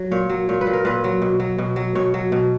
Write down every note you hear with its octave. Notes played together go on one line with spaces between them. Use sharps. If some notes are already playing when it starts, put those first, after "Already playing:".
Already playing: F#3
A#2 C#5
F#3
A#2 C#5
B4
A#2
A#4
A#2 B4
F#3
B2
F#3
B2
F#3
B2 C#5
F#3
B2